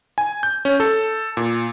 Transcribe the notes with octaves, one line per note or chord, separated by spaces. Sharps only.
G#5
G6
C#4
A4
A#2